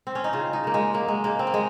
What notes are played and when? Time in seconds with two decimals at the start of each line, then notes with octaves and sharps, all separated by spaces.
0.07 C4
0.15 C#4
0.24 D#4
0.33 C#3 F4
0.53 D#4
0.64 C#3 A#3
0.74 G#3
0.93 F#3 A#3
1.08 G#3
1.24 C#3 A#3
1.39 C4
1.47 A#3
1.54 G#3